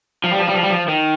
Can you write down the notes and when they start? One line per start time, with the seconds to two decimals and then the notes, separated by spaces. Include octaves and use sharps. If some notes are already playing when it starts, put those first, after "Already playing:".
0.24 F3
0.31 G3
0.39 F3
0.48 G3
0.55 F3
0.63 G3
0.70 F3
0.88 D#3